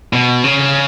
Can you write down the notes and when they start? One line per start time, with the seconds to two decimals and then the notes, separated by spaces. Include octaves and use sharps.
0.13 B2
0.44 C#3